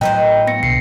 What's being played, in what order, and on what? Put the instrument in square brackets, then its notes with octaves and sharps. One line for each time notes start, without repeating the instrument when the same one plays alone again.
[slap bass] A2 F#3 [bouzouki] D#4 B4 C5 [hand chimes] G5
[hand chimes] B3 A#6 C#7
[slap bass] B1 D3 [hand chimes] C7 C#7